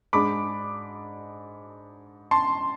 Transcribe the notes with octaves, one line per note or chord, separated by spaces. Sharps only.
G#2 G#3 D4 B5 D6
A5 C6